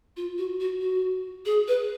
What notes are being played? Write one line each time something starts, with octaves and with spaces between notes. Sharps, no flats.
F4
F#4
F#4
F#4
G#4
B4